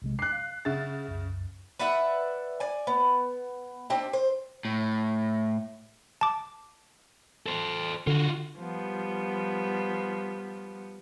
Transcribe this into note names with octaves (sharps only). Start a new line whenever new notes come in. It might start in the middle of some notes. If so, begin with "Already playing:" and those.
B1 C3 G#3
D6 F#6 C7
F5
C#3 G#4 E5 F#5 A6
C2 F#2
B4 D5 E5 F#5
D5 G#5
B3
C4 D4 G4 D#5
C5
A2
A5 D6
A4 C5
D3 F4 F#4
F3 G3 B3